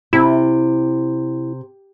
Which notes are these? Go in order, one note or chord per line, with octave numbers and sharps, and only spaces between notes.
C3 E4